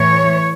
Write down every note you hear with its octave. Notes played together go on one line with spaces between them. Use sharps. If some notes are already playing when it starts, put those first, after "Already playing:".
Already playing: A2 E3 C#5